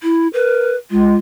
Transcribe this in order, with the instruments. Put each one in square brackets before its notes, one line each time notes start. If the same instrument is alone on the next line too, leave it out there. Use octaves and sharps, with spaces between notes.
[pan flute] E4
[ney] A#4 [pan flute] B4
[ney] G#3 [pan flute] F4